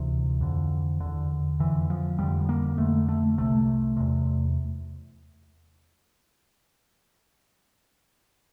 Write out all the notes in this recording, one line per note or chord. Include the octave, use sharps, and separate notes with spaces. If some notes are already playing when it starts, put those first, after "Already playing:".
Already playing: D2 C3 E3
F2 D3
E2 D3
F2 D3 E3
F3
F2 D3 G3
A#3
F2 D3 A3
A3
C2 C3 A3
E2 C3